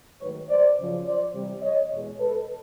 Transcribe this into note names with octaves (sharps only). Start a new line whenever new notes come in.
G#2 D#3 F#3 A3 B4 C#5
C5 D5
F#2 C#3 F3
C5 D5
C3 E3 G3
C#5 D#5
E2 B2 G#3
A4 B4